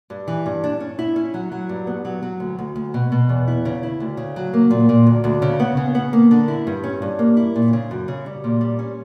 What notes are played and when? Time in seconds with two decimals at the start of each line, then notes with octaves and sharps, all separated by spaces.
0.10 G2
0.28 E3
0.46 G2
0.64 D4
0.80 C#4
0.99 E4
1.16 C#4
1.34 F#3
1.52 F#3
1.69 G2
1.87 B3
2.05 F#3
2.23 F#3
2.40 D2
2.59 D2
2.76 D2
2.94 B2
3.12 B2
3.29 E2
3.48 E4
3.65 C#3
3.83 E4
4.00 D2
4.17 C#3
4.36 F#3
4.54 A#3
4.71 A#2
4.89 A#2
5.07 D2
5.24 D2
5.42 C#3
5.60 B3
5.77 C#3
5.95 B3
6.13 A#3
6.31 D3
6.48 E4
6.67 G2
6.84 C#4
7.02 G2
7.19 A#3
7.37 E4
7.56 A#2
7.73 C#3
7.91 F#2
8.08 C#3
8.26 G3
8.44 A#2
8.61 G3
8.79 C#4